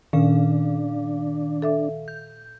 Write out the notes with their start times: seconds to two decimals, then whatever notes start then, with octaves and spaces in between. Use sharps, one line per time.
0.13 A#2 D#3 C#4 D4 F5
1.62 A4 E5 D6
2.08 G6